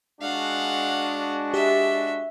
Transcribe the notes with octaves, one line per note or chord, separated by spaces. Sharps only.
G#3 D4 F#4 F5 F#5
G4 E5